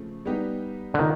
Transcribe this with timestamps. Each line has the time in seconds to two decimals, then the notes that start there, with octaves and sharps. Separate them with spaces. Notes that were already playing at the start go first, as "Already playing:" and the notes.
Already playing: C#3 F3 A3 C4
0.25 G3 B3 D#4 G4
0.94 D3
0.99 D#3 F4